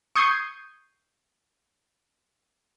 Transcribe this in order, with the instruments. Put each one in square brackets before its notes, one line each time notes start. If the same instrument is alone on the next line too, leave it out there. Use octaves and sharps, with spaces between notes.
[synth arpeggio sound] C#6 D#6 G6 G#6 C7 D#7